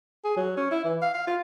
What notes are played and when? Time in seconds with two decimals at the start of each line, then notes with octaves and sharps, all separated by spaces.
0.24 G#4
0.37 F#3
0.57 C#4
0.71 E4
0.85 E3
1.02 F5
1.14 F5
1.27 F4